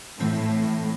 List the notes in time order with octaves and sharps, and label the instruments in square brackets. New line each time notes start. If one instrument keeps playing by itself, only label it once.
[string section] A2 [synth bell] E3 C4 A5